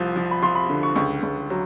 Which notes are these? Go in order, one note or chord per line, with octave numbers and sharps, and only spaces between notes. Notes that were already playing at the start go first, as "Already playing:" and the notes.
Already playing: C2 F3
F3
B5
F3 C6
B5
D3
C#6
C#2 C#6
C#2
F#3